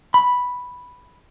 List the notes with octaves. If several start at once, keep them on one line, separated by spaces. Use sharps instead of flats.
B5